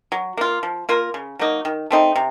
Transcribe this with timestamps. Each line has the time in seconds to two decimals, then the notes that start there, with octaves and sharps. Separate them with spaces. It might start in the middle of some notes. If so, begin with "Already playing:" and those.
0.12 F#3
0.37 A#3 F4
0.63 F3
0.89 A#3 F4 A#4
1.14 C#3
1.39 F#3 A#3 D#4
1.65 D#3
1.91 A3 C4 D#4
2.16 C3